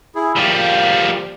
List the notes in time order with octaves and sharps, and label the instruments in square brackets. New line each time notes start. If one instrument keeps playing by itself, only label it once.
[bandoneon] E4 G#4
[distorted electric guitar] F3 G3 [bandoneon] A#3 G4